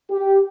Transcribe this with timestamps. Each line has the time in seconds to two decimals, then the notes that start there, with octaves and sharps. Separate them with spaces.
0.11 G4